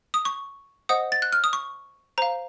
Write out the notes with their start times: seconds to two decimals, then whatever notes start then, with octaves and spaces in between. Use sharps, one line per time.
0.14 D#6
0.25 C#6
0.89 C5 D#5 F#5 D#6
1.12 A6
1.22 F#6
1.33 F6
1.44 D#6
1.53 C#6
2.18 C5 F5 A#5